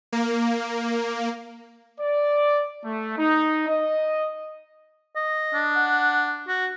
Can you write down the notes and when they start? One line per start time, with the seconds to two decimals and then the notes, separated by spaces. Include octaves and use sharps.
0.13 A#3
2.01 D5
2.85 A3
3.18 D#4
3.68 D#5
5.16 D#5
5.54 D4
5.76 F#5
6.48 F#4